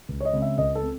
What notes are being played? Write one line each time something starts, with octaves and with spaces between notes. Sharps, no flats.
C#2
C#5
D#5
C#3 G#3 C4
E5
C#2 D#5
A4
C4